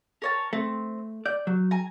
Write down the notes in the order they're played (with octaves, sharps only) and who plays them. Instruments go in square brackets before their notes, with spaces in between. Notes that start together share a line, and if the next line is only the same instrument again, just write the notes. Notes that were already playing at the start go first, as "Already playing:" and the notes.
[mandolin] A#4 C#5 A5
[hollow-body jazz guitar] A3 [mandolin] C4
[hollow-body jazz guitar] D5 [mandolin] G6
[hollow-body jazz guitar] F#3
[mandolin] G#5 A#5